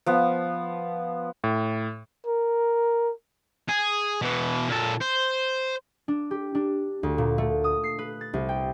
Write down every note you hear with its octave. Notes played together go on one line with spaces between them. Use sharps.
F3 B3
A2
A#4
G#4
B2 E3
A#2 A4
C5
D4
G4
D4
D2
A#2
A3
D#6
C7
B4
A6
C2
G5